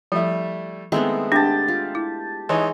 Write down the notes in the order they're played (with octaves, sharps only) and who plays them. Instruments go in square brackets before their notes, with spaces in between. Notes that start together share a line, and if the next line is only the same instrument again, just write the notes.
[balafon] F3 [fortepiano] G3 A3 E4
[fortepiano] D#3 C4 E4 [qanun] G#3 A3 B3
[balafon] D4 [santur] G4 A5
[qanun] F4
[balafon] E4
[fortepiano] E3 D#4 C#5 [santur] G#3